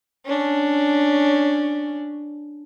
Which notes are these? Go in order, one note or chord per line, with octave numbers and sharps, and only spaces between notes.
C#4 D4